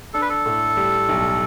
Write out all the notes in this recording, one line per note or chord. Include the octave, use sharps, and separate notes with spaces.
D4 A4
B4
A4
A2
G3
B1